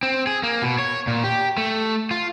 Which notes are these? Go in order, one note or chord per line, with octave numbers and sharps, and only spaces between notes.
C4
G#4
A#3
B2
C#5
A#2
G4
A3
F4